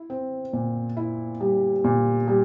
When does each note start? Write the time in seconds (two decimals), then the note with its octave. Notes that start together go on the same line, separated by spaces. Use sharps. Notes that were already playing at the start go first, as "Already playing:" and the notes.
Already playing: E4
0.10 C4
0.53 A#2
0.97 E4
1.41 G3
1.84 A#2
2.28 G3